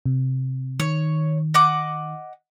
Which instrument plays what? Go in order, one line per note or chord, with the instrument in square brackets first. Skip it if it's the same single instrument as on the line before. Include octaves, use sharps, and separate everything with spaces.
[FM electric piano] C3
[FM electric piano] D#3 [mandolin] C#5
[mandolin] D#5 F#5 D6